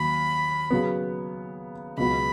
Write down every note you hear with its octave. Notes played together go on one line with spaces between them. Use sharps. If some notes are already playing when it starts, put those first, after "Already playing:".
Already playing: D#2 F#3 B5
C#3 F#3 B3
C#2 B2 F#3 B3 F#4 B5